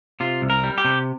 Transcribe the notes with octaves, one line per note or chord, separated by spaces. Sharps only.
C3 F4
C2
A#4
G3
G4
C3